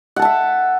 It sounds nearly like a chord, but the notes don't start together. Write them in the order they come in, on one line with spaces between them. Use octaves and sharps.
F#5 A4 A5 E5